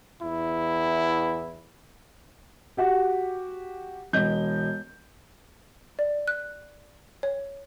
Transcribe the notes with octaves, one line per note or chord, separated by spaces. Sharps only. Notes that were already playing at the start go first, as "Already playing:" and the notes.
E2 E4
F#4 G4
E1 D#5 G6
D5
F#6
C#5